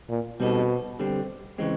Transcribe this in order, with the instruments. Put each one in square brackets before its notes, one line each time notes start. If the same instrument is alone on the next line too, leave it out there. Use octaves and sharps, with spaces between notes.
[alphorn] A#2
[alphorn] B2 [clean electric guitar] G3 C4 D#4 F#4 A4
[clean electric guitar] D3 G3 C4
C#3 E3 G#3 C4